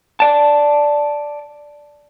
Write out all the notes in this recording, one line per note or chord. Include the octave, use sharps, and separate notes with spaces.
D5 A5